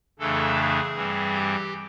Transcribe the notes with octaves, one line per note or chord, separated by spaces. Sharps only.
F2 C#3 E3 A3 D4 A4
G#4
G2 E3 G3 C4
G4